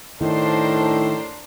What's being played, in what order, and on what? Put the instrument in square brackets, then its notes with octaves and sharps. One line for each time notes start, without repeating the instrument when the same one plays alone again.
[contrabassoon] A2 [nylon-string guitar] D#3 [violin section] D4 A#4 C5